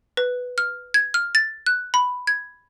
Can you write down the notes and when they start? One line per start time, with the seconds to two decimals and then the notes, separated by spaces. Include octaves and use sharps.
0.17 B4
0.58 F6
0.94 G#6
1.14 F6
1.35 A6
1.66 F#6
1.94 B5
2.27 G#6